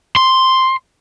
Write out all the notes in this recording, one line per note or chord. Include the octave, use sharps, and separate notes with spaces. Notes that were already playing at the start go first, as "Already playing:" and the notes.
C6